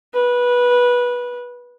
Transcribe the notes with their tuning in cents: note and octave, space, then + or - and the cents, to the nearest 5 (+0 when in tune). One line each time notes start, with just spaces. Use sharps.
B4 -15